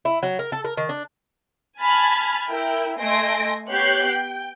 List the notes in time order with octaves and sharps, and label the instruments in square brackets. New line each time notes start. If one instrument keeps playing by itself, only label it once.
[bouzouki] E4
F#3
A#4
A4
A#4
D#3
D4
[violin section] G#5 A5 B5 F6 G#6 A6
E4 A#4 G5
A3 D#5 G#5 C6 A#6 D7
B3 G4 C#5 F#6 G6 C7
G5